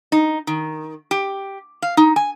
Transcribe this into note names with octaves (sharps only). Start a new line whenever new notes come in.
D#4
D#3
G4
F5
D#4
G#5